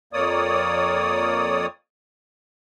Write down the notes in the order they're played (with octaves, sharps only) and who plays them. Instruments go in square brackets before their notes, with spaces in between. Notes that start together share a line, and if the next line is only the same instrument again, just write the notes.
[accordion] F2 A#3 C#5 D5 D#6